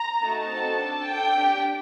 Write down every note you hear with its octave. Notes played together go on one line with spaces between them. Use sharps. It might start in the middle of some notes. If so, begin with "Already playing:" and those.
Already playing: A#5
A3 D#4 F#4 A5
C4 D#4 F#4 A4
D4 A4
D4 A4 G5
D4 G4